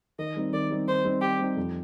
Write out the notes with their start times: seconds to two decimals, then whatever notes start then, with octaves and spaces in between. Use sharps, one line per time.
0.19 D#3 D#5
0.36 G3 C4 D#4
0.53 D#3 D5
0.71 G3 C4 D#4
0.88 D#3 C5
1.05 G3 C4 D#4
1.22 D#3 G4
1.39 G3 C4 D#4
1.57 F2